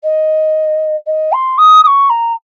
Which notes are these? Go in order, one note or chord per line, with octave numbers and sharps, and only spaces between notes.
D#5
D#5
C6
D#6
D#6
C#6
A#5